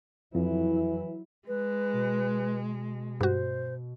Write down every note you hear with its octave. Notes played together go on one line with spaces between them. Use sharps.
F2 E3 F#3 E4
G#3 B4
B2
G2 F#4 C5